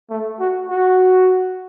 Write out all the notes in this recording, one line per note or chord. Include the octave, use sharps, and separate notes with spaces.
A3
F#4
F#4